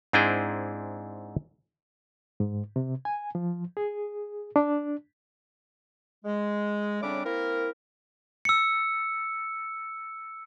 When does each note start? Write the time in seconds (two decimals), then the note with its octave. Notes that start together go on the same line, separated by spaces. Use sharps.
0.13 G#2 C4 D4 E4 G#4 G5
2.40 G#2
2.76 C3
3.05 G#5
3.35 F3
3.77 G#4
4.56 D4
6.25 G#3
7.01 A2 C#3 G3 C4 D4 D6
7.24 A#3 C4 E4 A#4
8.45 E6 C#7